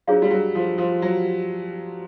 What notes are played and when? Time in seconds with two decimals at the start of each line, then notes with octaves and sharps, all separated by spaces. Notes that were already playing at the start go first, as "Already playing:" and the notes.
0.08 F#3 D4 F4 G#4 C#5 F5
0.22 G3
0.31 F#3
0.55 F3
0.78 F3
1.02 F#3